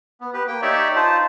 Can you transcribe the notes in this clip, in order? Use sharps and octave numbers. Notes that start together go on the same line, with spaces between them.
B3
G4 B4
A#3 G5
D#4 G4 C#5 D5 E5
D#4 F4 C5 A5